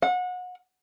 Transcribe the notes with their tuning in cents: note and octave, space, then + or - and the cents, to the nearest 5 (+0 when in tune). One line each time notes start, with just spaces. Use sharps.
F#5 -30